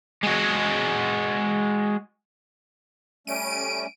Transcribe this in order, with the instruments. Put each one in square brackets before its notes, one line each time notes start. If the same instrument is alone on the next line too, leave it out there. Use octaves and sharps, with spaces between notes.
[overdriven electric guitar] G#3 F#4
[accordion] G3 A3 C#4 [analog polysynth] D7 D#7